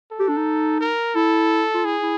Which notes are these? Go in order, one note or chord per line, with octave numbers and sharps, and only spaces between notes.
A4
G4
D4
D#4
A#4
E4 A4
F4
E4 G#4
E4